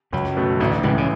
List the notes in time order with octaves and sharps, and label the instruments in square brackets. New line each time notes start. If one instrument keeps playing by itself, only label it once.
[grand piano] C#2 [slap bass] F#2 F#3
[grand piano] B2 A3
[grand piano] A1 [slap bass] D2 D3
[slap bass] C#2 C#3 [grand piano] A2 E3
[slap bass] C#3